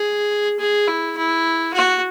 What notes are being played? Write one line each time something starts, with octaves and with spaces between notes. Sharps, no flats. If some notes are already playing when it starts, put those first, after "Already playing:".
Already playing: G#4
G#4
E4
E4
F#4